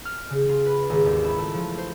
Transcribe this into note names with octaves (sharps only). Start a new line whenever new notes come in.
F6
C#3
F4
B4
G#1
D#2
E4
A3
F3
C5